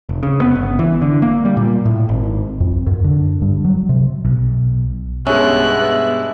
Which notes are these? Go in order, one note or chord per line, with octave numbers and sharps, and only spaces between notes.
F1
C#3
B3
G1
E3
D3
A#3
G3
A#2
A2
G#1
F2
F#2
D3
G2
F#3
C3
B1
G2 B2 G#3 B3 C#4 E5 F#6